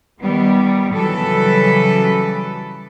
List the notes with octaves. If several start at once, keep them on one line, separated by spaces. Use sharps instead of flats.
D#3 G3 B3
C#3 E3 F#3 G3 A4 B4